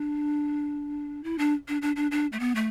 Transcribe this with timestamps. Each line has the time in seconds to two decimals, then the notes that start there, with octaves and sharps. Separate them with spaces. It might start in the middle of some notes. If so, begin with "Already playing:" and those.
Already playing: D4
1.24 E4
1.38 D4
1.68 D4
1.82 D4
1.96 D4
2.11 D4
2.32 A3
2.40 B3
2.55 A3